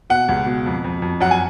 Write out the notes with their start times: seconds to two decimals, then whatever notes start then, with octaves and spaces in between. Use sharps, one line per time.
0.10 B2 F#5
0.29 C#2
0.46 B2
0.66 F2
0.84 F2
1.02 F2
1.21 F#2 F#5
1.31 G#5